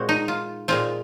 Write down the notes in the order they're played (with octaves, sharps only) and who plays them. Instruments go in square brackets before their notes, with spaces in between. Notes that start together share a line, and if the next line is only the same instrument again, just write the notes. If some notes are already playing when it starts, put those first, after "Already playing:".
Already playing: [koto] A#2 G#3 C4 F#4
D#4
F4
A#2 G#3 C4 F4